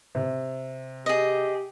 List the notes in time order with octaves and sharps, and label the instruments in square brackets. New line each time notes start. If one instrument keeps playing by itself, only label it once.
[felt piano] C3
[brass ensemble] G4 [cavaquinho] G#4 D#5